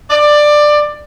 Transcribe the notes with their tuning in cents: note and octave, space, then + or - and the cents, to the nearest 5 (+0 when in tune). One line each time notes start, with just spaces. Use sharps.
D5 +15